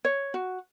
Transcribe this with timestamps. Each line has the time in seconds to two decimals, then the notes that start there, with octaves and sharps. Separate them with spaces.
0.05 C#5
0.34 F#4